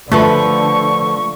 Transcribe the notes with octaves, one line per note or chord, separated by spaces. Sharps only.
D3 F3 A3 A4 B4 C#6